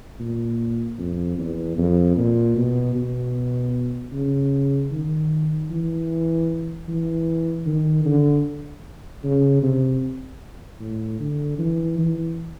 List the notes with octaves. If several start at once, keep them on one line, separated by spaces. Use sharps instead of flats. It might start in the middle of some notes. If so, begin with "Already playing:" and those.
A#2
F2
E2
F2
A#2
B2
B2
C#3
D#3
E3
E3
D#3
D3
C#3
C3
A2
D3
E3
E3